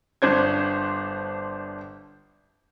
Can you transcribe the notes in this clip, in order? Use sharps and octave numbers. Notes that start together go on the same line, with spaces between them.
G1 D4 C5 G#6